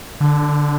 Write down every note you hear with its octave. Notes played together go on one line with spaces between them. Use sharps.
D3